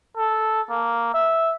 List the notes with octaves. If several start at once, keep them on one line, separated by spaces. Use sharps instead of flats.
A4
A#3
E5